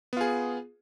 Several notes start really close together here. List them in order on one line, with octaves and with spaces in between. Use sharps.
B3 F4 G#4